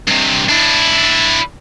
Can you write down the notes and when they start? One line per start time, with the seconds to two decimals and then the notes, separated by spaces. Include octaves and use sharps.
0.08 G2 C3
0.49 D4 E4